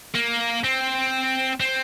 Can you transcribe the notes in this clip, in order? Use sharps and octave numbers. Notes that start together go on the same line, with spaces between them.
A#3
C4
C4